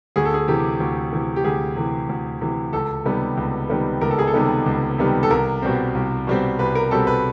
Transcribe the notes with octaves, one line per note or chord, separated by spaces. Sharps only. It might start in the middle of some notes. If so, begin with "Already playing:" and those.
D2 G#4
A4
G#4
C3 E3 G4
D2
C3 E3
G4
D2 G#4
C3 E3
D2
C3 E3
C#2 A4
C3 D#3 G3 B3
C#2
C3 D#3 G3 B3
C#2 A#4
A4
G#4
A4
C3 D#3 G3 B3
C#2
C3 D#3 G3 B3
A4
C2 A#4
B2 G3 C4
C2
B2 G3 C4
C2 B4
A#4
B2 G3 C4 A4
B4